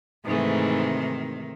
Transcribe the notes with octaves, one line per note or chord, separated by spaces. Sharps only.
G#2 C3 D#3 E3 A3